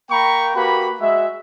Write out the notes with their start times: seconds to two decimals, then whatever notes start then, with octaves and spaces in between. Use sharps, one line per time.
0.11 A#3 G5 A#5 B5 C#6
0.56 A#3 F#4 G4 B4 B5
1.00 G#3 F#4 E5